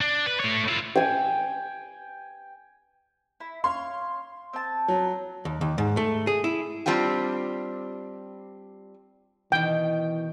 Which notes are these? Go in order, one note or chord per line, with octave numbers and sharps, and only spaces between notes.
D4
B4
A3 C#5
E4 F4
G5 G#5
E4
C#5 F5 C6
C4 A5
F#3
D#2
D#2
G#2
A3
G#4
E4
G3 C4 D4 F4 G4
B2 D#3 E3 G5